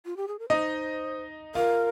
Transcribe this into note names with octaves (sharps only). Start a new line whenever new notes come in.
F4
G4
G#4
A#4
D#4 C5 D#5
F4 A#4 F5